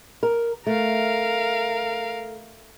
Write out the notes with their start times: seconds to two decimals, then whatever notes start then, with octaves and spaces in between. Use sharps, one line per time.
0.23 A#4
0.67 A3 A#4 F5